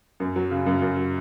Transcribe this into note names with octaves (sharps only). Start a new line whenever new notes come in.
F#2
F#3
C#3
F#2
F#2
F#3